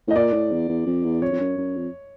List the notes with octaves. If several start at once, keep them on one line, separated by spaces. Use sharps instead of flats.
A2
D#5
A#2 D5
A2
E2
E2
F2
E2
F2 C#5
F2
F#2
F#2
F2